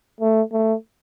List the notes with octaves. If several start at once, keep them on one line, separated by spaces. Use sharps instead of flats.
A3
A3